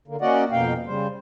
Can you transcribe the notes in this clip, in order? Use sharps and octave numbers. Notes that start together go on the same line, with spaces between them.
D3 A#3
A#3 C#4 F#4 D5 D#5 F#5
F2 B2 A#3 F5 G5
C#3 G3 C5